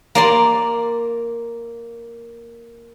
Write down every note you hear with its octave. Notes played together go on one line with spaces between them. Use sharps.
A#3 D5 C6